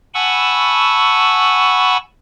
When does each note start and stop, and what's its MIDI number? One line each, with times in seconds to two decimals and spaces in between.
0.14 1.97 78
0.14 1.97 80
0.14 1.97 81
0.14 1.97 83
0.14 1.97 85
0.14 1.97 88